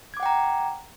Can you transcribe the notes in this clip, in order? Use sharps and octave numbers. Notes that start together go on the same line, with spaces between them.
F#5 G5 A#5 D6 G#6